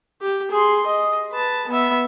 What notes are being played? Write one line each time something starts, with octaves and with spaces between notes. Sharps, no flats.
G4
G#4 C6
D#5
B4 A5
B3 E5